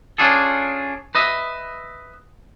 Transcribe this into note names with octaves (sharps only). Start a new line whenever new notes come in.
C#4 D4 F4 G#4 A4
B4 D#5 E5